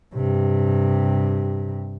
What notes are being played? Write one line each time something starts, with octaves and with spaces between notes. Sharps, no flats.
G2 C3